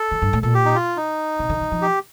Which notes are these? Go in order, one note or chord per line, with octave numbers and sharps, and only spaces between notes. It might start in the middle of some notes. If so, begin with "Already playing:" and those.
Already playing: A4
D3
G2
A2
A#2 A4
G4
D#4
F4
D#4
C3
D3
D#3
F3
G4